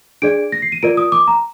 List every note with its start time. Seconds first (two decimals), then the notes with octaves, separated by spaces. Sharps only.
0.22 D4 G#4 D5 D7
0.52 A#6
0.62 C7
0.72 D#7
0.83 F4 A#4 D5 D7
0.97 D#6
1.12 D6
1.28 A#5